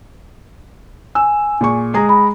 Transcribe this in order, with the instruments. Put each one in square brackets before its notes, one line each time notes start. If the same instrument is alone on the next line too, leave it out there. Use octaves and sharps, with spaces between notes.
[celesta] G#5 [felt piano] E6
[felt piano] A#2 G#4 C#6
G#3 G#4 A#5
[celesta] B5